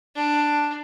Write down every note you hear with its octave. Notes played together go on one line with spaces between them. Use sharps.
D4